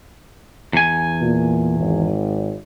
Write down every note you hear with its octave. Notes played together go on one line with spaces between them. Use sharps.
E2 G#5
A#2
G#1